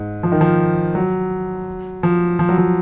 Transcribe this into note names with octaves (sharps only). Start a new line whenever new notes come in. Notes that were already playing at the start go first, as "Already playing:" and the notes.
Already playing: G#2
F3
D#3
F3
F#3
F3
F3
F#3
F3